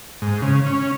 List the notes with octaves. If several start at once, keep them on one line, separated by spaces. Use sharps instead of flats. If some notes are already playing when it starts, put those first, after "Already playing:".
G#2
C#3
C#4